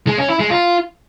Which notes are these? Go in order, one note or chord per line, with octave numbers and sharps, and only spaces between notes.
G#3
C#4
E4
G#3
F4